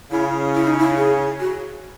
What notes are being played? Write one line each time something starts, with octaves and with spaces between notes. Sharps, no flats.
C#3 E4
E4
D#4
E4
G#4
F#4